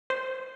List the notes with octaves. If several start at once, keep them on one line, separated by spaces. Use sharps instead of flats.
C5